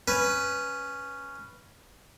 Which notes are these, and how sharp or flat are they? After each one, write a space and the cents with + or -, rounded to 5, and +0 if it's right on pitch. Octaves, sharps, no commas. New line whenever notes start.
C#4 +0 B4 +0